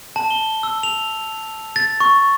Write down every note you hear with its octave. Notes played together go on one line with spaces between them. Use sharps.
A5
G7
E6
F7
A6
C#6